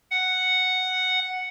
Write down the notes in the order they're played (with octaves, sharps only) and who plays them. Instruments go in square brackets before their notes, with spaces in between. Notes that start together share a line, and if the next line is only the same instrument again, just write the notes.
[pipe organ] F#5